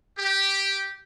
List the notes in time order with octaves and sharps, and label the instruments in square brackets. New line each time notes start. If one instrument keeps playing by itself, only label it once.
[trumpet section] G4